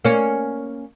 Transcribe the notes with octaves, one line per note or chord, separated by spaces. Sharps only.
A#3 C#4